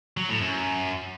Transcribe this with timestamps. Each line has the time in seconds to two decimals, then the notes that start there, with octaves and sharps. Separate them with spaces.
0.17 F#3
0.29 A2
0.41 F#2